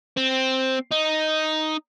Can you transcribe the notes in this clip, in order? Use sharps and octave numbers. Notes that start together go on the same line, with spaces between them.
C4
D#4